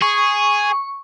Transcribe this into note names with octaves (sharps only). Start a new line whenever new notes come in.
G#4 C#6